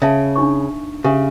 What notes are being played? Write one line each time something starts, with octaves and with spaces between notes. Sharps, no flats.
C#3 E5 F5 A5
D4 D#4 C#6
C#3 G4 E5 G#5